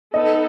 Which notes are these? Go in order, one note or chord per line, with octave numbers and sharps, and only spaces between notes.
B3 D#4 A4 D#5